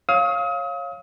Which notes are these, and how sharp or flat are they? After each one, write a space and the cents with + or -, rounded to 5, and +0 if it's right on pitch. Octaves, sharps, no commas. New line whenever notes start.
C#5 -10 F5 +0 D#6 +40